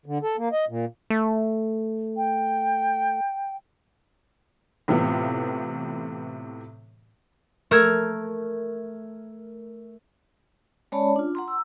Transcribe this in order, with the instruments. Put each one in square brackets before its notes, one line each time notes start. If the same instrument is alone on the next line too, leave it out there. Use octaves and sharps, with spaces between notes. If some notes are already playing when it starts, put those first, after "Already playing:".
[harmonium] D3
A4
A#3
D#5
A#2
[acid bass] A3
[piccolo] G5
[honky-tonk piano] A2 C3 E3 B3 F4
[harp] A3 A#4 E6 F6 G#6
[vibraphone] G#3 C#4 C#5 D5 A5 B5
D4 F4
F#5 A#5 C6
E6